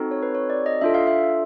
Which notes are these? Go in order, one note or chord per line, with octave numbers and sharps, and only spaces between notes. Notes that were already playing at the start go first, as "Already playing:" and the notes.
Already playing: C4 D#4 F#4 A4
C#5
B4
C#5
D5
D#5
D4 F4 A4 E5
F5
E5